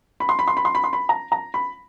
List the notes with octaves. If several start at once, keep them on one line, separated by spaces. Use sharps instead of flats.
B5
C6
B5
C6
B5
C6
B5
C6
B5
A#5
A#5
B5